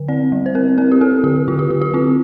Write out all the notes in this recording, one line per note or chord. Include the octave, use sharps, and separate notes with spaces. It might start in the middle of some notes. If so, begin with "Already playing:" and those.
Already playing: D3
C4 D5
G3
C5
C4 A#4
C4 A#4
G4
C4 A4
D3 G4
D3 F4
G4
D3 G4
G4
C4 F4